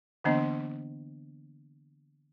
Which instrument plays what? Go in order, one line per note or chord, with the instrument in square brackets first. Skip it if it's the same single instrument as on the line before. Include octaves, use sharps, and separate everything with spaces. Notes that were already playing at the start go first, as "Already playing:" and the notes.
[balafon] D3 E3 A#3 B3 D4 D#5